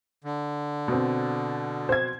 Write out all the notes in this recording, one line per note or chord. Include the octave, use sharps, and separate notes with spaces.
D3
B2 C4
C5 G#6